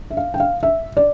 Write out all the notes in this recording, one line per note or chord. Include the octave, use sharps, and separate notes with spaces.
E5
F5
G5
F5
E5
D5